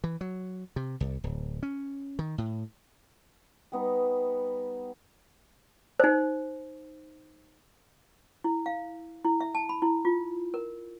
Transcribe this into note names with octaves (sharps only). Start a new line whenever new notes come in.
E3
F#3
C3
C2
D1
C#4
D#3
A2
G3 B3 D#4
D#4 C5
E4
F5
E4
E5
A5
B5
E4
F4
A#4